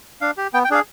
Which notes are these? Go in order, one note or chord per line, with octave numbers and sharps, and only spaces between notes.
D4 F5
G4
B3 G5
G5
D4 G#4 F5